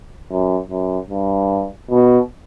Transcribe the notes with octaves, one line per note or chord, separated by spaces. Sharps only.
F#2
F#2
G2
B2